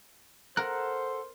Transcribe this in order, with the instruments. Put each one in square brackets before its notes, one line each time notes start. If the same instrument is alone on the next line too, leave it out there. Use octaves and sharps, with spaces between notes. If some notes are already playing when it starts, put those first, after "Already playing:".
[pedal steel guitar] A4 F#5 F#6 [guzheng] A#4 [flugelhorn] C5